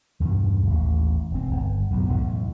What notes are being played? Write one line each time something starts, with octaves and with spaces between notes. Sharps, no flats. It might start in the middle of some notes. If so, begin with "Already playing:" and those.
E2 G2 B2
A1 D#2
E1 C4
G1
B1 F#2 A2
B1 E2 A2